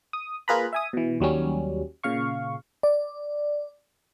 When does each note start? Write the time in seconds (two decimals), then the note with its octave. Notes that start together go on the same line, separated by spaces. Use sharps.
0.13 D#6
0.48 A#3 F4 G#4 B4 A#5 B5
0.73 E5 G#5 D#6
0.93 B2 E3
1.20 D#2 F#3 G3 C#4
2.04 A#2 C#3 F5 C#6
2.83 D5